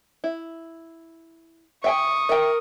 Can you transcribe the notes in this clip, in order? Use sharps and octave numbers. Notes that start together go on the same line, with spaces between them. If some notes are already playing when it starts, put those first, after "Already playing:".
E4
E5 G5 G#5 C#6 D#6
A#4 E5 G5